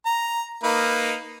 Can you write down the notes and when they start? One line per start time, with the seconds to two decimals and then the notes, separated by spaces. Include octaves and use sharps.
0.06 A#5
0.63 A#3 D#4 B4